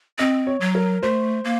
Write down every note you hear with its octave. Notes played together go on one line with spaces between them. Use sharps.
C4 D#5
C#5
F#3
A#4
A3 C5
A#3